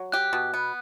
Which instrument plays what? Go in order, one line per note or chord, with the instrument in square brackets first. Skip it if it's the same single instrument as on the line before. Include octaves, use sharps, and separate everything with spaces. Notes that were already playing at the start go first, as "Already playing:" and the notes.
Already playing: [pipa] F#3
[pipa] G4 [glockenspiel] F#6
[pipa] B2
B3